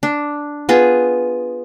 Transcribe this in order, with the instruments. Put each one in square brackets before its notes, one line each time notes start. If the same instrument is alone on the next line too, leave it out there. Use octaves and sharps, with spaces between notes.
[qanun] D4
B3 F4 G#4